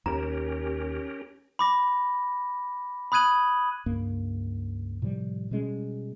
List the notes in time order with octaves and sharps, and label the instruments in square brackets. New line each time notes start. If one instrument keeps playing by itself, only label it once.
[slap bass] D#2 [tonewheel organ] C#4 G4 A#4 [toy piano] A#5
[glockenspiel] B5 D6 A#6
B5 D#6 F#6 G#6 D#7 F#7
[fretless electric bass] C#2 G2 A#3
A2 C3 F3 G3
B2 G3 G#3 C#4